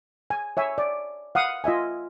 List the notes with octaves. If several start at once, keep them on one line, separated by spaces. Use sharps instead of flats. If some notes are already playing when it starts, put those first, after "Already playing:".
G#5
C#5 E5 G#5
D5
F5 F#5 D#6
F4 D#5 E5 G#5